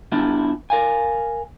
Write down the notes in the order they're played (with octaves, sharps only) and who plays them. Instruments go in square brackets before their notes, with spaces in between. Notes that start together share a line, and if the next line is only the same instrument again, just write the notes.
[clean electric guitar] B3 D4 E4 F4 E5
A#4 F5 G#5